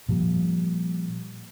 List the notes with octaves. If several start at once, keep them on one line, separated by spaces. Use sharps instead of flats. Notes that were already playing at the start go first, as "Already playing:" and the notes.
A#2 F3 G3